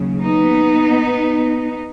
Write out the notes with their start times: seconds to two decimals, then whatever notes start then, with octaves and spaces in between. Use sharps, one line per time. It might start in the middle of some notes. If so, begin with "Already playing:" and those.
Already playing: D#2 C#3 F#3
0.20 B3 D#4